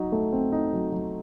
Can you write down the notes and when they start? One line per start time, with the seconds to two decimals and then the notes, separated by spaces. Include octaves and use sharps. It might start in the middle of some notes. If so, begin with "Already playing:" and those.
Already playing: F#3 D#4
0.12 A3
0.33 C4
0.52 D#4
0.73 F#3
0.92 F#3